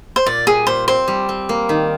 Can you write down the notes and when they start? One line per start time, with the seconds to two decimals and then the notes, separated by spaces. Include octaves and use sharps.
0.16 C5
0.26 A#2 D5
0.47 G3 G#4
0.67 A#2 C5
0.88 C4 C5
1.08 G3
1.29 C4
1.49 A#3
1.69 D#3